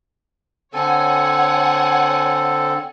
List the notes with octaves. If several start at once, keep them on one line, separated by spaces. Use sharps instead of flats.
D3 C4 A4 C#5 F#5 G#5